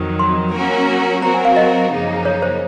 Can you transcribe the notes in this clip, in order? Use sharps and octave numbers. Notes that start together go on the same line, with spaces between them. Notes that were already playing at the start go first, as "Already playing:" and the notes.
Already playing: F2 D#3 F#3
C6
F#3 A#3 C#4 F#4 A#4
F#3 C4 F#4 A#4 A#5
G#5
F5
D#5
F#2 C#3 F3 A#3 D#4
C#5
C5